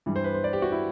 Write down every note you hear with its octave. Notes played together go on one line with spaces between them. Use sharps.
G2 E3 G3
C5
B4
C5
D5
G4
F#4
E4